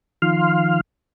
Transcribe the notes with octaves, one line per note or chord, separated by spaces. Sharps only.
D#3 F3 F5 C6 F6